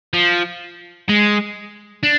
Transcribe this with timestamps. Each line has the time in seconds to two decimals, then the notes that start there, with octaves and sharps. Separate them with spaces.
0.14 F3
1.09 G#3
2.03 D4